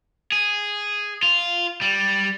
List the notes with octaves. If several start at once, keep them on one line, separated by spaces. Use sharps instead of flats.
G#4
F4
G3